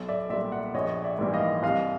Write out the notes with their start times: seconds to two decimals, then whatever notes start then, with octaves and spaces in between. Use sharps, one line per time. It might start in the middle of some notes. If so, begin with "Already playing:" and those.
Already playing: B1
0.08 D5 E5
0.30 A#2 D5 E5
0.33 G3
0.52 E5 F#5
0.74 A#1 C#5 D#5
1.04 D5 E5
1.19 G#2 E3 G3 A#3
1.33 D#5 F5
1.63 C2 D#5 F5